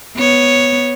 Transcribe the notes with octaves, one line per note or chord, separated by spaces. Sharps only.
B3 C#5